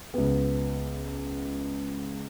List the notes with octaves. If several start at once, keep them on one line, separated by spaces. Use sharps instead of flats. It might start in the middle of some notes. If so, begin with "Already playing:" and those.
C#2 B3